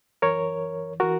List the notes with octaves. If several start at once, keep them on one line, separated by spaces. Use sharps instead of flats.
F#2 E3 A#4 C#5
E3 F#4 A#4